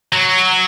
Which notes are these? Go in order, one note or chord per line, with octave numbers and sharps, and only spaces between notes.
F#3